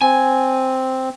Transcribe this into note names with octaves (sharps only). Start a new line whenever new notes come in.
C4 G#5